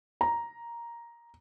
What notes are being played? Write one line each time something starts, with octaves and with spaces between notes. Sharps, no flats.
A#5